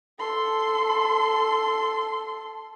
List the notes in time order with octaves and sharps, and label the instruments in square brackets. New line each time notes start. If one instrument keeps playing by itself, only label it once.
[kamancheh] A4 C6